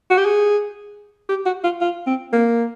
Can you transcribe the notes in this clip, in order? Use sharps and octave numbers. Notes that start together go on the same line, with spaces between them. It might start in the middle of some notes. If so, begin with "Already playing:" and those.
F#4
G4
G#4
G4
F#4
F4
F4
C4
A#3